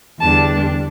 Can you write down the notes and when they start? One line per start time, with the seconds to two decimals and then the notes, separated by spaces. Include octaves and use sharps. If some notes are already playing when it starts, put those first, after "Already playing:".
0.20 E2 D3 G3 D4 A5